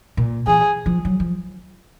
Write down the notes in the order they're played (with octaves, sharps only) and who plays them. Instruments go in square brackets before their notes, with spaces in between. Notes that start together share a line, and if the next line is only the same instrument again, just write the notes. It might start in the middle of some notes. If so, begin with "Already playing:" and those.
[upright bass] A#2
[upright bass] E3 [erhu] G#4
[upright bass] F3
F#3
F3